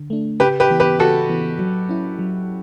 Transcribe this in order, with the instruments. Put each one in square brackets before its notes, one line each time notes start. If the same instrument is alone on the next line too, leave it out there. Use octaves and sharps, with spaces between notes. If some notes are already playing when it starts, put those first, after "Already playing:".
Already playing: [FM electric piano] D3
A3 D4
[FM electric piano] C#3 [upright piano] G4 B4
[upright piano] G4 B4
[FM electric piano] E3 B3
[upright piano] G4 B4
[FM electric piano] C#3 [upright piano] F#4 A4
[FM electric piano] E3 B3
F#3
C#4 E4
F#3